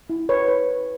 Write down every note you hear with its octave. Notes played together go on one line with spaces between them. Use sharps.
E4
B4 C#5
B4